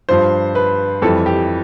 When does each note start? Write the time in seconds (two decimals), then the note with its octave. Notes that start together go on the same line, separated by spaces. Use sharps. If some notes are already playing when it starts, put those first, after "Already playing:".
0.09 G2 F3 C5
0.55 B4
1.02 F2 E3 G3 A4
1.26 G4